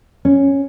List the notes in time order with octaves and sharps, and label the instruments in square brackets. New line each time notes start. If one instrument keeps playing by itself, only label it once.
[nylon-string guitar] C#4